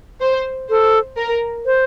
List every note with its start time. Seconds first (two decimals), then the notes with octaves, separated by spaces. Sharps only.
0.21 C5
0.70 A4 C5
1.17 A#4
1.66 C5